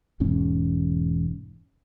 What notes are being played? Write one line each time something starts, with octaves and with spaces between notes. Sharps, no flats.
E1 E2 G#2 C#4